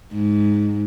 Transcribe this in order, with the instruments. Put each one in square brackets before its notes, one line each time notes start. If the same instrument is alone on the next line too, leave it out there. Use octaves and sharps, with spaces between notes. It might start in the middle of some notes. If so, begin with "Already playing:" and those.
[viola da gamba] G#2